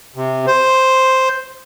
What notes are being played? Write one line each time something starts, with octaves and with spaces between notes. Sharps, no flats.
C3
C5